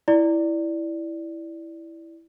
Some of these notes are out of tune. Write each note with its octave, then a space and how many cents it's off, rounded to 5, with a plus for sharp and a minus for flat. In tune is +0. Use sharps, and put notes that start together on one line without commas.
E4 +0 D5 +0